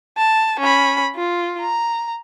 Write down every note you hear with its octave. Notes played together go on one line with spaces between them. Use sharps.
A5
C#4 B5
F4
A#5